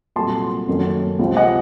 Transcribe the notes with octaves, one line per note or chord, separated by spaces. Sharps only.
C2 A#2 F#3 A3 A5 C6
F#1 F#2 D#3 A3 C#4
C#2 C3 F3 C4
D#5 F#5